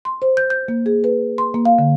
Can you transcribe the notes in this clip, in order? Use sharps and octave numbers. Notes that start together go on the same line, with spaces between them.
C6
C5
G6
G6
A#3
G#4
B4
C6
A#3
F5
D3